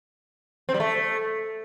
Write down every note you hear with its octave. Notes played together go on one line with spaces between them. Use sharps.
C4
G3
A3